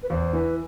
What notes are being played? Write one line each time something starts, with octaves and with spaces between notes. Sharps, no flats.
B4
E2 C5
E3 B4